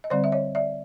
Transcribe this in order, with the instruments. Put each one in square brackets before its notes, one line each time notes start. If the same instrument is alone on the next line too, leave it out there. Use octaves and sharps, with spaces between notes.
[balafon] D#5
D3 G3 C4 C5 D5
E5
C#5 D#5
D5 E5